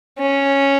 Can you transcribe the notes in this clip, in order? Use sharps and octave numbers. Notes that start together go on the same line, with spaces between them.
C#4